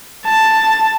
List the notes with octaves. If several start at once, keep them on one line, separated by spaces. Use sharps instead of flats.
A5